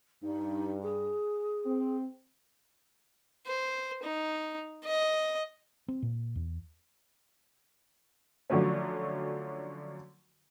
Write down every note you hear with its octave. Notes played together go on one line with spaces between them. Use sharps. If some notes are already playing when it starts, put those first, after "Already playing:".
G2 D#4
G#4
C4
C5
D#4
D#5
C4
A#2
E2
D3 F3 F#3 A3 C#4